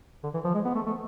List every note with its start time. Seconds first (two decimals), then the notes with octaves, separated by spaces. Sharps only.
0.24 D3
0.34 E3
0.45 F3
0.54 G#3
0.65 B3
0.75 A3
0.86 A3